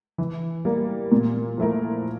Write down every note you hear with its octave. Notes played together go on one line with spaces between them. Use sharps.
E3
G3 A#3
A#2
F3 A3 E4 A#4